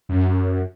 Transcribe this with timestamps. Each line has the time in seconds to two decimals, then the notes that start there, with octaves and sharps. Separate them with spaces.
0.09 F#2